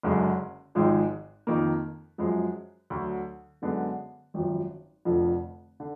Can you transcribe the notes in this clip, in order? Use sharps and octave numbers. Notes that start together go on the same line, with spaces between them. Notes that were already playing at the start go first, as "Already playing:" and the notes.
F#1 F#2 D3 G#3
G#1 G#2 F3 G#3
F2 D#3 A#3
F#2 F3 G#3
D2 D3 F#3
F#2 D3 G#3 B3
G#1 F#2 F3
F1 F2 D3 F3
D3